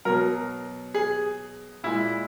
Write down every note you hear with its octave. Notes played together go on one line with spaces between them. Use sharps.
B2 F#3 A#4
G#4
A#2 G#3 E4